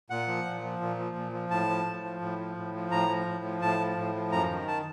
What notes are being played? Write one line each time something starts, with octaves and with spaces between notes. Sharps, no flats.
A#2 F#5
F3
A#2
F3
A#2
F3
A#2
F3
A2 A5
F3
A2
F3
A2
F3
A2
F3
A2 A#5
F3
A2
F3
A2 A5
F3
A2
F3
F#2 A#5
D#3
A5